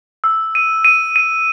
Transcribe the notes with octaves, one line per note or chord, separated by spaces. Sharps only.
E6
D#7
D#7
D#7